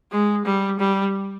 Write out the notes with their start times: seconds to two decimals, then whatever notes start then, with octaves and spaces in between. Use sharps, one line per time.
0.11 G#3
0.45 G3
0.79 G3